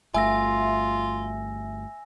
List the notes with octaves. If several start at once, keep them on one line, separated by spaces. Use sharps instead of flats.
G1 A3 F4 E5 G#5 E6 A#6